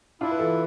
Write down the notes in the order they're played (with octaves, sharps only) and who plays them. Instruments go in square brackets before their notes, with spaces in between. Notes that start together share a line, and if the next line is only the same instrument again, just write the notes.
[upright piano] D4 F4 [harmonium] E4
[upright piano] B4
[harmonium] E3 [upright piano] F4 A4